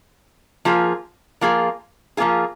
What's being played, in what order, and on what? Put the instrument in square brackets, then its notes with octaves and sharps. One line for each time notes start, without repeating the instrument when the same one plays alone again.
[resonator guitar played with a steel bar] F3 A#3 F4 G#4
F3 A#3 F4 G#4
F3 A#3 F4 G#4